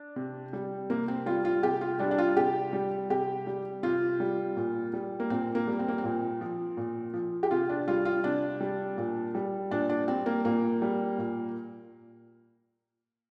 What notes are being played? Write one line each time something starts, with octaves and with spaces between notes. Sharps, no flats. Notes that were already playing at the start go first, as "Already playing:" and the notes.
Already playing: D4
C3
G3
C3 A#3
C4
G3 F4
F4
C3 G4
F4
G3 D4
D4
F4
C3 G4
G3
C3 G4
G3
C3 F4
G3
A#2
G3
A#3
A#2 C4
A#3
G3
C4
A#3
C4
A#2
F3
A#2
F3
G4
C3 F4
D4
G3 F4
F4
C3 D4
G3
A#2
G3
A#2 D4
D4
G3 C4
A#3
A#2 A#3
G3
A#2